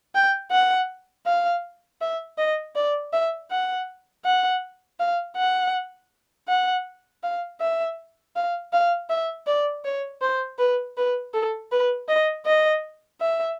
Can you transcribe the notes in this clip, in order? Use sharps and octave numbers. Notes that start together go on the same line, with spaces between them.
G5
F#5
F5
E5
D#5
D5
E5
F#5
F#5
F5
F#5
F#5
F5
E5
F5
F5
E5
D5
C#5
C5
B4
B4
A4
B4
D#5
D#5
E5